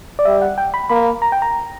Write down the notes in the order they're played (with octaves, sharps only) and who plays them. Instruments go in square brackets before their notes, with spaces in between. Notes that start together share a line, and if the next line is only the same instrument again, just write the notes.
[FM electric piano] D5
[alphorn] G3 [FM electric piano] E5
[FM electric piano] F#5
G5
B5
[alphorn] A#3 [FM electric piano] B5
[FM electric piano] A#5
G5
A#5